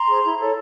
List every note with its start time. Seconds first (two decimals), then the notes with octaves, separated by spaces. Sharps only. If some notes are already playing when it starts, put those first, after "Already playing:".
Already playing: A#5 C6
0.08 G#4 C5
0.23 E4
0.39 A4 C#5